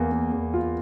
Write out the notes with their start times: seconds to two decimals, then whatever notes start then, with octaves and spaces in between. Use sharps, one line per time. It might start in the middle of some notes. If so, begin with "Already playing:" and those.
Already playing: E2 A#3 F5
0.12 A#3
0.32 E2
0.54 F4